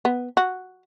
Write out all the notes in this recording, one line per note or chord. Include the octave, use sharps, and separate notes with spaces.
B3
F#4